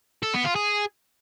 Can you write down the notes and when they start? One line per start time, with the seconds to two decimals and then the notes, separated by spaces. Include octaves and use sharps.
0.23 A4
0.34 B3
0.45 F4
0.55 G#4